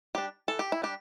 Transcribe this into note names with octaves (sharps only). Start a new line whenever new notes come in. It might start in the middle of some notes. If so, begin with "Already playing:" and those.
G3 D4 G4
E3 A4
G4
E4
G3 D4 G4